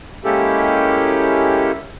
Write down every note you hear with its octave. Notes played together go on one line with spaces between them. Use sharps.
G#3 A#3 C#4 E4 G4 A4